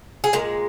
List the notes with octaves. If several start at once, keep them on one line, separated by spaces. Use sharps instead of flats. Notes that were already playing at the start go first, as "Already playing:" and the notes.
G#4
A#2 G#3 A#4